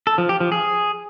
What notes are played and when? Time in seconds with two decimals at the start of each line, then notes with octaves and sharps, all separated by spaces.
0.07 A4
0.18 F3
0.29 G4
0.40 F3
0.52 G#4